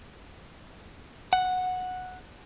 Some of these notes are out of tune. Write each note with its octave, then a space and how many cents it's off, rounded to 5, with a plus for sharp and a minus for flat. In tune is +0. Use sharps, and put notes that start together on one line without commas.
F#5 -10